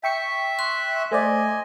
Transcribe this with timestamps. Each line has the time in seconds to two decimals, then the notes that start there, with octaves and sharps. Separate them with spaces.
0.03 E5 G5 C#6 C#7
0.59 C6 F#6
1.11 A3 C5 D5 D#5 G#5